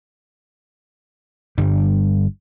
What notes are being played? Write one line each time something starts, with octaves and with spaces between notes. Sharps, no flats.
G1 G2 G3